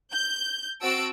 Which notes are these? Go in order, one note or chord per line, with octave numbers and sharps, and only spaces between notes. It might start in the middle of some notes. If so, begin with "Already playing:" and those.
G6
C4 F#4 A5 E6 D7